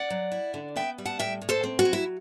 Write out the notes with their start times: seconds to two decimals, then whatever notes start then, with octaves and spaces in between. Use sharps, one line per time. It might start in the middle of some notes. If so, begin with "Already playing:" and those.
Already playing: D5 F#5
0.10 F#3
0.32 E4
0.54 D3
0.76 B3 E5 G5
0.98 G3
1.06 F#5 A5
1.19 A2 E5 G5
1.41 A2
1.49 A4 C5
1.64 C4
1.79 F#4
1.85 F#3
1.93 E4